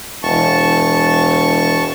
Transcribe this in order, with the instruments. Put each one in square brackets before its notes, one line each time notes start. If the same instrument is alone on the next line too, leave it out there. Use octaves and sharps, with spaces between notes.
[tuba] E1 [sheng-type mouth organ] A5 C#6